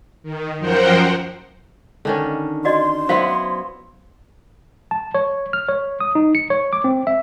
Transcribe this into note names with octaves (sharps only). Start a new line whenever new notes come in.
D#3
F#2 F3 A#4 C5 F#5 G5
D3 D#3 C#4
F#4 D5 D#5 C6
F#3 B3 E4 C5 F5
A5
C#5
F6
C#5
D#6
D#4
C#7
C#5
D6
C4
E5